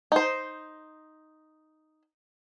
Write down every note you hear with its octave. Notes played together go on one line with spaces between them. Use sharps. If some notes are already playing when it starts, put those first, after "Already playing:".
D#4 C5